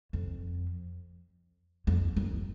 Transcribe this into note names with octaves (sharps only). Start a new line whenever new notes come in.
F2
F2
F#2